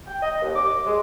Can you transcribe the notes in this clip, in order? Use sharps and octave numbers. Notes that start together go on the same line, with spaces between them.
G5
D#5
D#2
D6
G#3